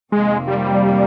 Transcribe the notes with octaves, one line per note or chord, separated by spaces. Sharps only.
F2 C3 D#3 G#3 A#3
G3